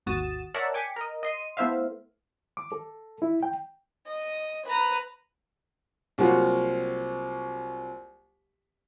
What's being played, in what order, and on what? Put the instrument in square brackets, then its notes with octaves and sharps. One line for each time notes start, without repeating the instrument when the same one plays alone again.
[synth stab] G#1 D#2 F#4 D#6 A6 E7
A#4 C#5 D5 E5 F#5 A5
G5 G#5 D6 B6 C#7
A#4 D#5
D#5 C6 D#7
A3 B3 E4 C5 E5 F5
[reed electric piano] D6
A4
E4
G5
[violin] D#5
B4 A#5
[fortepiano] C2 F#3 A#3 F4 F#4 F#5